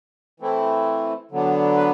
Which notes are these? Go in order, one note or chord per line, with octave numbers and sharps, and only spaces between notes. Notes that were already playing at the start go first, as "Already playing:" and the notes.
E3 A3 C4 E4
D3 F#3 B3 D4
B4